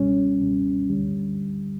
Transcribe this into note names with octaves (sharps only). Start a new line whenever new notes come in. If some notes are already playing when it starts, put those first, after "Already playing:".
Already playing: C#2 B2 G3 C#4
C#2 B2 G3
D2 D3 G3